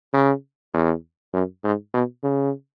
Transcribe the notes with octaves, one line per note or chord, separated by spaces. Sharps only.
C#3
E2
F#2
G#2
B2
C#3